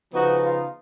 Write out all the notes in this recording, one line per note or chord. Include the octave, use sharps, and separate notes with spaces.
C#3 F3 B3 D#4 F#4
F4